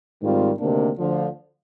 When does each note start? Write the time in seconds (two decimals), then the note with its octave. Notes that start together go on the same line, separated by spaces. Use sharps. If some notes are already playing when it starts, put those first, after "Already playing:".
0.22 G#2 D#3 G3 C4 F4
0.59 D2 C3 D#3 A#3 D4
0.97 D2 D3 F3